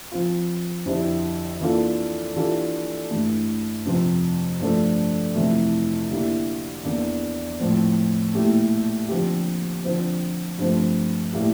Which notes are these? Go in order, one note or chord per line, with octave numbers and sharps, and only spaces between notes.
F3 C4 F4
F2 D3 G3 C4 E4
E3 A#3 D4 F4 A4
E3 G3 D4 F4 A4
G2 E3 A3
F2 C3 F3 C4
G2 F3 A3 D4 A4
F2 C3 E3 A3 E4
D3 G3 A#3 E4
E2 E3 A#3 D4
A2 F3 C4
A#2 A3 E4 G4
D3 F3 C4 G4
D3 F3 C4
G2 F3 A3 C4
A2 G3 A#3 E4 G4